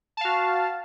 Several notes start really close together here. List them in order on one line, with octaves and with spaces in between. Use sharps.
A5 F5 F#4